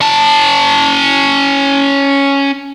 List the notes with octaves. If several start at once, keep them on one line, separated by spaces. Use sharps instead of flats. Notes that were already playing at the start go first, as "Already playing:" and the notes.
C#4 A5